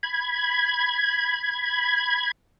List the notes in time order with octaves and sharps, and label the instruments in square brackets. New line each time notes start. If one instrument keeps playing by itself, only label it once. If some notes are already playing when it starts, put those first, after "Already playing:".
[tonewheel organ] B5 G#6